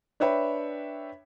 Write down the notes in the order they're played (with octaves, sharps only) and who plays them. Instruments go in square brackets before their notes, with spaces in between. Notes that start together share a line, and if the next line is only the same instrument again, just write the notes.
[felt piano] D4 B4 C#5 E5 G5 B5